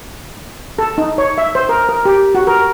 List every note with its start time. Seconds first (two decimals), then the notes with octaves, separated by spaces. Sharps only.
0.79 A4
0.98 D#4
1.18 C#5
1.38 E5
1.55 C5
1.69 A#4
1.89 A#4
2.05 G4
2.35 F#4
2.47 A#4